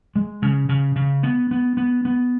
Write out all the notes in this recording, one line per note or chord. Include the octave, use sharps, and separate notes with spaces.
G#3
C#3
C#3
C#3
B3
B3
B3
B3